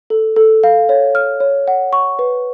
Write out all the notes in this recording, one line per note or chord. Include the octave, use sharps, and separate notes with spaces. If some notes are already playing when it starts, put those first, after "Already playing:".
A4
A4
F5
C#5
F6
C#5
F#5
C#6
B4